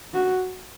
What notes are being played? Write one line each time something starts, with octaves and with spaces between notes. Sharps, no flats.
F#4